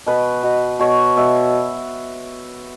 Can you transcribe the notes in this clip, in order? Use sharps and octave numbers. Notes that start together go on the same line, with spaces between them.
B2 B4
B2
B2 C#5
B2 E5